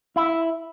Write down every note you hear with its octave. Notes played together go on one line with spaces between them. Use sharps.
E4